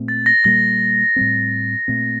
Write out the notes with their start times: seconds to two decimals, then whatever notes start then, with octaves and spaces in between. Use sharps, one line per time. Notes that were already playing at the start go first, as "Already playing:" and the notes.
Already playing: A#2 A3 C4
0.08 A6
0.26 A#6
0.44 A#2 G3 A#3 A#6
1.16 A2 G3 C4
1.88 A#2 A3 C4